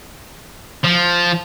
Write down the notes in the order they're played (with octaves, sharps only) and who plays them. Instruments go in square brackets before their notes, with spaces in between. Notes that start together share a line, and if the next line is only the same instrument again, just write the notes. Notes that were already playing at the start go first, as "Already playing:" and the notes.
[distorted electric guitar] F3